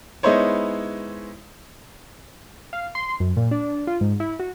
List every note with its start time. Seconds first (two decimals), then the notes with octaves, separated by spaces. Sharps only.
0.23 G#3 B3 D#4 E4 C5 C#5
2.73 F5
2.95 C6
3.20 F#2
3.37 A#2
3.51 D4
3.87 F4
4.01 G#2
4.20 E4
4.39 F#4